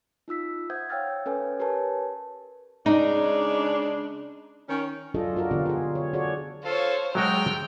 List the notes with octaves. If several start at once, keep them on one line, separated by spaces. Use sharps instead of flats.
D#4 F4 E6 B6
C5 E5 F#5 D#6 G6 G#6
C#5 F5 G5 E6 F6 A6
C#4 A4 B4 C#5 G#5
G4 A#4 B4 C#5 G#5 A5
C#3 G#3 D4 D#4
D#3 C#4
F#3 D4 F4 G#4 A4 D#5
F4 F#4 A#4 D5
D3 E3 B3 F4 G4
F4 G#4
C#5
F#4 G#4 A4 C#5 D5
F4 A4 C5 C#5 F5
F#3 G#3 A3 F#4 G5 F6